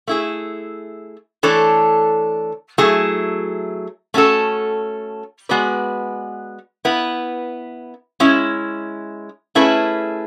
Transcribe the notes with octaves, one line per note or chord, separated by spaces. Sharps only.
A3 E4 G#4
E3 A3 D4 A4 C#5
F#3 A3 E4 G#4
A3 C#4 F#4 A4
G#3 B3 F#4 B4 D5
B3 E4 B4
G#3 C#4 E4
A3 C#4 E4 G#4 B4